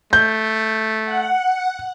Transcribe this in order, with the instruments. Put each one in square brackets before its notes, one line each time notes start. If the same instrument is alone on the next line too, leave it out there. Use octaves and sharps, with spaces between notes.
[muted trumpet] A3 [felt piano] G6
[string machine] F#5